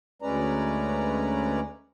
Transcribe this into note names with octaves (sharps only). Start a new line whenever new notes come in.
D2 G#3 C#4 B4 D5 A#5